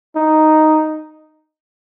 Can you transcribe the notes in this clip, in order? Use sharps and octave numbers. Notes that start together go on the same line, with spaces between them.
D#4